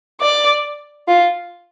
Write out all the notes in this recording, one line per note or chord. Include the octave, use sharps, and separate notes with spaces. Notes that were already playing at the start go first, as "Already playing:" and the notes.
D5
F4